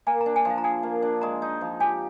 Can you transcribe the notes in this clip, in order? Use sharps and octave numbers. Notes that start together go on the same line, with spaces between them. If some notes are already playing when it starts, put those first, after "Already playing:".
A#3 G#5
A#5
D4
G#5
F3
F5
A#5
G#4 G#5
A#3
D4
G#3 A#5
D#4
F3
G4 G#5